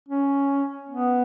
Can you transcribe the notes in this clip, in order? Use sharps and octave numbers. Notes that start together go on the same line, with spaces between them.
C#4
B3